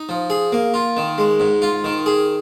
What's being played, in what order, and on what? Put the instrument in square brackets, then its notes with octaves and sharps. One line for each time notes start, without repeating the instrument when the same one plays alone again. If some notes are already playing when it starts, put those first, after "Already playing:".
Already playing: [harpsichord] D#4
F3
G#4
A#3
F4
D#3
G#3
G#2
F4
D#3
G#4